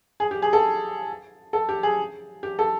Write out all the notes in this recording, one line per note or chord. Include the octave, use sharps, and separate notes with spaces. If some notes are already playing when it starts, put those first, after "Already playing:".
G#4
G4
G#4
A4
A4
G4
G#4
G4
A4